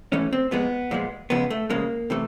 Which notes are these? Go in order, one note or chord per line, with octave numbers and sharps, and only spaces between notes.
G#2 E3 A3 C#4
C4
A#2 F3 G#3 B3
A#2 F3 G#3
C#2 C#3 F3 G#3 B3
A3
C#2 C#3 F3 G#3 A#3
C3 E3 A3